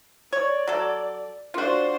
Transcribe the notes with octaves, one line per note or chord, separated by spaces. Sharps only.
C#5 D5
F#3 A4
D4 F4 F#4 C5